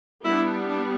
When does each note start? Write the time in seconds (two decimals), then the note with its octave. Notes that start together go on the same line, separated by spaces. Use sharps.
0.24 G3 B3 D4 E4
0.67 D4